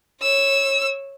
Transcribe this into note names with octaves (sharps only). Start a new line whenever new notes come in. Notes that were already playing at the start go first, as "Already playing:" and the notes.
C#5 E6